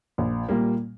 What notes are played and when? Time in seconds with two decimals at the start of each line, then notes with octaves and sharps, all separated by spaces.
0.18 A#1
0.49 A#2 G3 A#3